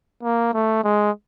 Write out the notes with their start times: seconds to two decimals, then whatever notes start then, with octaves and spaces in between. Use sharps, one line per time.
0.23 A#3
0.54 A3
0.84 G#3